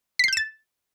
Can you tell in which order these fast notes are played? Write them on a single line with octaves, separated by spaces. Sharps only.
B6 C7 G6 E7 A6